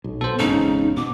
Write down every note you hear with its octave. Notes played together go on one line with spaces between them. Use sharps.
B1
B2 A4 C5
G#1 E2 G#2 C#3 D#4
B2 D6